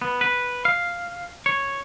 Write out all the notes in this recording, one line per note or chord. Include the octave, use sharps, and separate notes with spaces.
B3
B4
F5
C#5